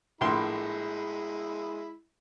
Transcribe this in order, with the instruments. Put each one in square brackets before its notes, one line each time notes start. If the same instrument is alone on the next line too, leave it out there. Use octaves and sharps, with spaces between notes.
[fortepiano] A#1 A2 C6 [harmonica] G#3 E4